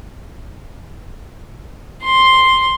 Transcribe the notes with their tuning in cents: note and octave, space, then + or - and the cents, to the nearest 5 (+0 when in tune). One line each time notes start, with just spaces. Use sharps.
C6 +5